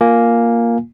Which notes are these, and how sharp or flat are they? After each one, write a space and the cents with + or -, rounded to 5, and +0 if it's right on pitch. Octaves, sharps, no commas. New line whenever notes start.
A#3 +0 F4 +5 G#5 +0